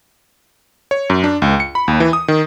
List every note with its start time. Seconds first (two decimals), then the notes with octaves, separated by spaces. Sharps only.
0.91 C#5
1.10 F#2
1.24 D4
1.42 C#2
1.60 C#7
1.75 B5
1.88 D#2
2.00 E3
2.13 D#6
2.28 D#3